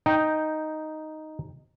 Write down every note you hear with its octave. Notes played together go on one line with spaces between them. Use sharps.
D#4 G5